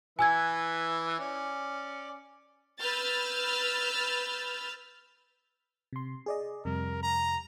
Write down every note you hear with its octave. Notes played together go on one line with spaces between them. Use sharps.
E3 B4 E5 G#5 E6 G#6
C#4 D5
B4 E6 F6 G6 A6
C3 C6
G#4 D5 D#5
F2 C3 G3 A#4
A#5